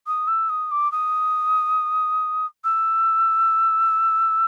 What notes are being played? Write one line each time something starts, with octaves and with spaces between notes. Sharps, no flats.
D#6
E6
D#6
D6
D#6
E6